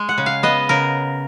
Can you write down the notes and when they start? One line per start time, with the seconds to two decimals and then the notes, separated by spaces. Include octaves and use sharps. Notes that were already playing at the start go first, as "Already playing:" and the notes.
Already playing: G#3
0.09 F#5
0.18 C#3
0.26 F5
0.43 B3 D#5
0.69 C#3 A#4